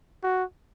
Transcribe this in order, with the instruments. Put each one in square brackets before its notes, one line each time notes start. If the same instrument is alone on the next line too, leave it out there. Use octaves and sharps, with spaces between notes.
[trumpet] F#4